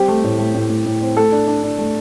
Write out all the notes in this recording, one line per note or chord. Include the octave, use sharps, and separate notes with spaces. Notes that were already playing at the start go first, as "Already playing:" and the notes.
Already playing: G3 C4 G4
A3
A2
A3
A2
A2
A2
C4
A3 A4
D4
D4
D4
A3